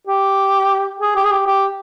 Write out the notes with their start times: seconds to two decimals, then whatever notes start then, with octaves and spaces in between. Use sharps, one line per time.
0.07 G4
1.00 G#4
1.16 G4
1.25 G#4
1.31 G4
1.47 G4